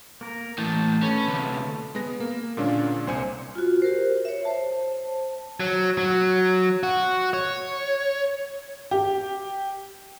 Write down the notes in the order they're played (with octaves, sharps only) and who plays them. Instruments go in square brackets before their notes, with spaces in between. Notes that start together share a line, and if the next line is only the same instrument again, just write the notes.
[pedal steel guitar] A#3 A#4
[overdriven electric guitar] A2 E3 [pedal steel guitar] G5 A5
[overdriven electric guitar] C#4 C#5 [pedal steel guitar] A4 B4
[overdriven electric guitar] D2 C3
[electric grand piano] G#3 B3 A#6
A#3
A#2 D3 G#3 C#4 D4 F4
C2 C5 G#5 C#7
[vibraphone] F4 F#4
G4 A#4 C5
C#5 E5
C5 A5
[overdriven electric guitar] F#3
F#3
F#4
C#5
[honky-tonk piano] G4